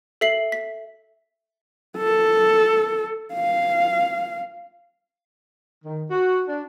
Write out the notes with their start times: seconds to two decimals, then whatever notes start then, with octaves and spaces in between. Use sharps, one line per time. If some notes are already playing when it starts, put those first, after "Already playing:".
0.21 A4 E5 B6 C7 F#7
0.52 B6
1.97 A4
3.33 F5
5.84 D#3
6.11 F#4
6.48 D4